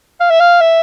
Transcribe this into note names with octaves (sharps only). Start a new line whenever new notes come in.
F5
E5
F5
E5